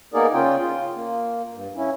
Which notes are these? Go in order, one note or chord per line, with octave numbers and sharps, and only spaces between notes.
A#3 B3 D#4 G#4 A#4 D5
C#3 C#4 F4 G5
F4
A#3
G2
C#4 E4